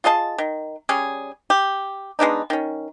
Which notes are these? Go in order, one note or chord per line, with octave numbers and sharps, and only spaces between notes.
F4 G#4 D#5 A5
D#3
G3 C#4 G#4
G4
G#3 B3 D4 D#4
D#3 C#4